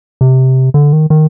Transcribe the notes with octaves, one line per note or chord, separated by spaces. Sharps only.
C3
D3
D#3
D#3